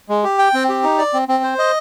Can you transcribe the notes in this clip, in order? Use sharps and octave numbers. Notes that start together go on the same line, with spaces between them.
G#3
G4
G5
C4
G4
D#4
D5
C4
C4
C5
D#5